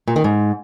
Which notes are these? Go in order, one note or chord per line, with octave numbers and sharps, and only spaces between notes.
A#2
D#3
G#2